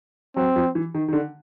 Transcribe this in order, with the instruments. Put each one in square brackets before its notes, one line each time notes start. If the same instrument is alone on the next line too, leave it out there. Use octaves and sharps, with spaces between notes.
[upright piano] F#3 [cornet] C4
[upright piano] F3
E3
D#3
D#3
D3